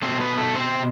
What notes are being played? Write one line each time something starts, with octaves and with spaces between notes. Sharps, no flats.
B2 A3 C4 C5
B3 B4
A3 A4
C4 C5